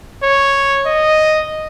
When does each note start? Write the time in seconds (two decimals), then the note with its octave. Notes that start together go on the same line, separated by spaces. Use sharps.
0.23 C#5
0.86 D#5